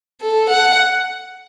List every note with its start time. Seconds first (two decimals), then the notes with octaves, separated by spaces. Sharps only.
0.22 A4
0.50 F#5